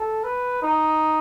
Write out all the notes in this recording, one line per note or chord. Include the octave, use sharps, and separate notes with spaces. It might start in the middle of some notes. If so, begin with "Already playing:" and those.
Already playing: A4
B4
D#4